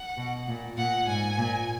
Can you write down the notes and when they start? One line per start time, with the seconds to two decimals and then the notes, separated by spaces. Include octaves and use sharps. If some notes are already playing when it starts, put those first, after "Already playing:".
Already playing: F#5
0.17 B2
0.48 A#2
0.77 A#2 F#5
1.07 G#2 G#5
1.38 A#2